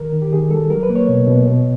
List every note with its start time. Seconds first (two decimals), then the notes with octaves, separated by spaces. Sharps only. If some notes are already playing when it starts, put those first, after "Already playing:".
Already playing: D#3 A#4
0.12 D#3
0.22 G4
0.32 D#3 G#4
0.50 G3 A4
0.70 F#3 A#4
0.83 B4
0.90 A#3
0.95 C#5
1.08 B2
1.27 B2
1.46 B2